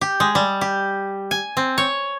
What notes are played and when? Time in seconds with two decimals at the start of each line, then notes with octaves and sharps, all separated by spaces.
0.01 G4
0.20 G#3
0.35 G3
0.61 G4
1.31 G#5
1.57 C4
1.78 C#5